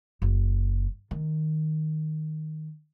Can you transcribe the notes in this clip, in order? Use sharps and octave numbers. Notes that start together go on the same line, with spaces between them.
F#1
D#3